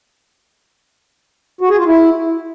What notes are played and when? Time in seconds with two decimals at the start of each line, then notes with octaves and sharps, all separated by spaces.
1.61 F#4
1.69 G#4
1.78 F4
1.87 E4